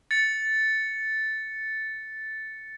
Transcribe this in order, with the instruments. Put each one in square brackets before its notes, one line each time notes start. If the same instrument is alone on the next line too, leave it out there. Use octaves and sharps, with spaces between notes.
[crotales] A6 C#7